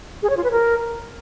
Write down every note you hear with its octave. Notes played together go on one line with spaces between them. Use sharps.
G#4
C#5
F4
B4
A#4